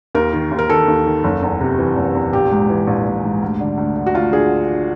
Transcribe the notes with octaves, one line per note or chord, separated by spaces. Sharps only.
D#2 A#4
D#3
D#2
A#4
D#3 A4
D#2
D#3
F#1
E2
C3
E3
F#1
E2
A#1 G4
G#2
E3
A#1
A#1
G#2
D2
D3
D2
D3
F#4
D2 F4
D3 G#4